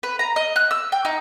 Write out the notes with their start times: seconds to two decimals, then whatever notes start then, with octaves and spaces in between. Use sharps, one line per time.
0.03 B4
0.19 A#5
0.36 D#5
0.56 F#6
0.71 E6
0.92 G5
1.05 D#4